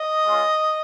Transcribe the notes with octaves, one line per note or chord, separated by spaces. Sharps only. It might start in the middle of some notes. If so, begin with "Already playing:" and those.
Already playing: D#5
G#3 C#4 F4